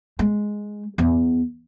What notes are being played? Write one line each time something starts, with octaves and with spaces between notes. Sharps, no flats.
G#3
E2